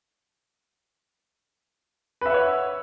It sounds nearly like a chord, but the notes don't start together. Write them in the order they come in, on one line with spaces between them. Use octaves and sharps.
B4 E5 F#5 C#5